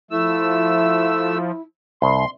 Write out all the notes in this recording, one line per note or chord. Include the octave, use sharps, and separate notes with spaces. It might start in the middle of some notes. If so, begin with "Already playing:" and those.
F3 A3 E4 E6
C2 C6